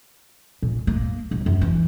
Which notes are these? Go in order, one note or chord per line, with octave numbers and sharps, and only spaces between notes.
A#2
A#3
D#1
F#2
E3